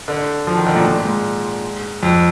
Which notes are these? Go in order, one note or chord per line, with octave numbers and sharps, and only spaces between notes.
D3
F3
D#3
D3
A#2
A#2
G#2
F2